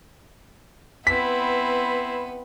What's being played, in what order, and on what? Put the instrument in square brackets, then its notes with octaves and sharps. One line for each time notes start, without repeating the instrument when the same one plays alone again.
[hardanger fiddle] B3 B4 [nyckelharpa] C4 E4 [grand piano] B6